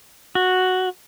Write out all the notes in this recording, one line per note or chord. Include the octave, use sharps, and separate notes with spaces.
F#4